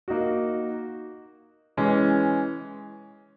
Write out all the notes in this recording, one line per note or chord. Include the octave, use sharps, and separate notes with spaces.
A#3 D#4 F#4
E3 G#3 C#4